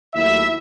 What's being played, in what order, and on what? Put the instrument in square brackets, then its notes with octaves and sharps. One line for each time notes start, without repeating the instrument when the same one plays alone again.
[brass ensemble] D#2 D#3 F#3 A3 E4 E5